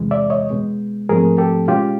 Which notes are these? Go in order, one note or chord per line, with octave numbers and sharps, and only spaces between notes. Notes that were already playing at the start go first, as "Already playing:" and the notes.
Already playing: E2 C3 E3 G#3
D5 E5
C#5 D#5
B2 G#3 B3
G#2 F3 A3 C4 G#4 A#4
G4 A4
B2 G#3 C#4 F4 G4